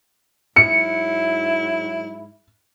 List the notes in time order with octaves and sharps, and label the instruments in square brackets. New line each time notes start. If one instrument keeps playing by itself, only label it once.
[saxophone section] G#2 F#3 E4 [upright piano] C#7